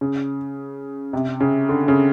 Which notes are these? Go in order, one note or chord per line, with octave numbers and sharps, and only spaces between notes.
C#3
C3
C#3
D3
C#3